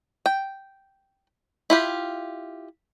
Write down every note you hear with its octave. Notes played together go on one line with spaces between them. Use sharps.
G5
E4 F4 G4